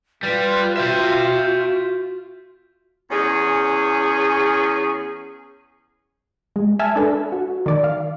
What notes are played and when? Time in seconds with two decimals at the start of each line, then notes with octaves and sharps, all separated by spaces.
0.23 G3 F4 B4
0.77 F#4 E5 G5
3.11 E2 C#4 G#4
6.56 G#3
6.79 E5 G#5 A5 F6
6.96 D4 A4 B4
7.32 F#4
7.66 D#3 D5
7.84 F5